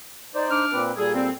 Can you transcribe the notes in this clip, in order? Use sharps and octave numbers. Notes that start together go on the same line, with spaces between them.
D#4 C5 D5
D4 D6 F6
A#2 C4 B4
A#2 G3 G#4 A4
C4